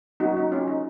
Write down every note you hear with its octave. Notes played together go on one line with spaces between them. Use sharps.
F#3 A#3 C#4 D#4 F#4
D#4
C#4 F4
D#4